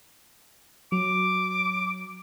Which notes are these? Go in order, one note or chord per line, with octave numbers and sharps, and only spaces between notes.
F#3 D6